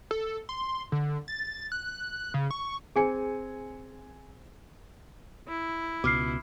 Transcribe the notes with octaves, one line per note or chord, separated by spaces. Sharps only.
A4
C6
D3
A6
F#6
C#3
C#6
C4 G#4 G#5 C#7
E4
C#2 B2 D6 F6 C7